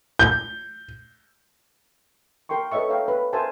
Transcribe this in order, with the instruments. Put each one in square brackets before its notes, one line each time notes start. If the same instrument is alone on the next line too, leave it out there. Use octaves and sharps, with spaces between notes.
[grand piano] G6
[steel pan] A#4 G5 C6 C#6
A4 B4 C#5 D#5 E5 C#6
A4 C#5 E5 F5 G5 A#5
B4
A#4 C5 E5 G#5 A5